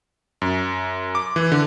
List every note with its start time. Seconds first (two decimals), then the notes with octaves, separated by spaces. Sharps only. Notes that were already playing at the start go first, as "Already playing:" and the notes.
0.42 F#2
1.15 D6
1.36 E3
1.52 D3